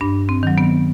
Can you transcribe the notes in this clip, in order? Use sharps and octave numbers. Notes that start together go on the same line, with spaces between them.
G2 D4
C4
D#3 F#3
B3